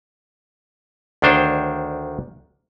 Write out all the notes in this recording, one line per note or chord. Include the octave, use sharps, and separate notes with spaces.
D2 D#3 D4 C5 C#5 G5